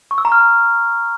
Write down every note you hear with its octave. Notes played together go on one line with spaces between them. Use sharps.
C#6
E6
A#5
F6
A#5